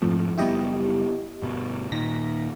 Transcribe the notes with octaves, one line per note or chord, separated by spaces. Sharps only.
F2 G#2 A3
F#1 G3 B3 E4 G4 D#5
G1 B2
D#1 A#2 D#3 A#6 B6